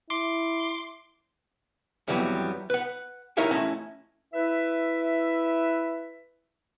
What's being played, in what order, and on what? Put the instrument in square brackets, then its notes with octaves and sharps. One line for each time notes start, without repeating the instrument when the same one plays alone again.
[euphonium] E4 [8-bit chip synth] C6 D6
[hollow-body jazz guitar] F2 E3 F#3 G3 B3
B4 F#5
D#4 E4 A#4 C#5 E5 F5
A3 C#4 E4 D#5
[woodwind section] E4 B4 E5